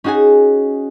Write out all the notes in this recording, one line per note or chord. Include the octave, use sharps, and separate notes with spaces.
C#4 D#4 F#4 G#4 G#5